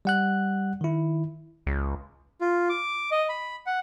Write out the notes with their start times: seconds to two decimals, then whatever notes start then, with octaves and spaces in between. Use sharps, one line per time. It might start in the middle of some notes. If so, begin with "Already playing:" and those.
0.05 G3 F#5 F#6
0.81 D#3 E4
1.67 C#2
2.41 F4
2.69 D6
3.11 D#5
3.29 B5
3.66 F#5